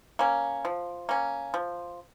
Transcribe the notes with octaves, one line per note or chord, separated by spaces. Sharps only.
A#3 C#4
F3
A#3 C#4
F3